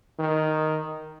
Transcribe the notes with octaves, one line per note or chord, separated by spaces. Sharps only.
D#3